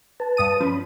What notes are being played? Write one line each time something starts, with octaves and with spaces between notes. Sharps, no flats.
B4 A5
G2 D#6 D#7
F3 C#4 B5